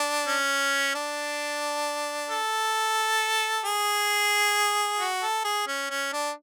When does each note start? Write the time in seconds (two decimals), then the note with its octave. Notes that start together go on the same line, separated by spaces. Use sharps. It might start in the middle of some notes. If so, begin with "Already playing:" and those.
Already playing: D4
0.27 C#4
0.95 D4
2.30 A4
3.65 G#4
5.00 F#4
5.22 A4
5.44 G#4
5.67 C#4
5.90 C#4
6.13 D4